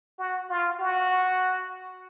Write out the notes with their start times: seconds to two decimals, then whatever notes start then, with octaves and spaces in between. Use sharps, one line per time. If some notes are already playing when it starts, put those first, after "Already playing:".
0.19 F#4
0.50 F4
0.80 F#4